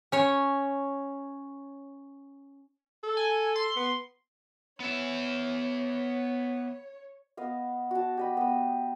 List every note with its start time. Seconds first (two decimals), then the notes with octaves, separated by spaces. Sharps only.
0.12 C#4 C#5
3.04 A4
3.17 G#5
3.55 C6
3.76 B3
4.80 B3 C#5 E5
7.37 B3 D#5 F5
7.91 F#4 A5
8.17 G4 D#5 B5
8.37 B3 D#6